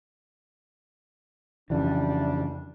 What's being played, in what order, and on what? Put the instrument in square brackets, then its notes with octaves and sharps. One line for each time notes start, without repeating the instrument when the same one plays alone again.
[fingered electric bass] F2 C#3 E3 [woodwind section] G3 D4